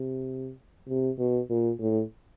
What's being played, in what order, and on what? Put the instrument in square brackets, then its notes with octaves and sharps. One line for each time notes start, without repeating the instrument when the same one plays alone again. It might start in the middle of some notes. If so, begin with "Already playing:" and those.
Already playing: [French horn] C3
C3
B2
A#2
A2